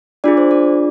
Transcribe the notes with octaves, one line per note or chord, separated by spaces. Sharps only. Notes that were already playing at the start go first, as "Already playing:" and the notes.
D4 F4 G#4 D5
C5
D5